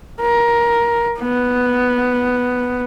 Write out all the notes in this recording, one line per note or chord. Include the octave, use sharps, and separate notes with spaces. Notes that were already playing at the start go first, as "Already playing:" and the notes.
A#4
B3